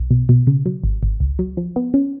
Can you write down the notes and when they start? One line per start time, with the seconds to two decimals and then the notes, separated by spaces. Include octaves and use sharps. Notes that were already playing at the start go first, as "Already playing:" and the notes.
Already playing: B1
0.11 B2
0.29 B2
0.47 C#3
0.66 F#3
0.84 G#1
1.03 G#1
1.20 C#2
1.39 F#3
1.57 F3
1.76 B3
1.94 C#4